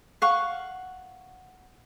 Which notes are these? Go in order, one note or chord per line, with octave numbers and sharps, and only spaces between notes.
F5 F#5 C#6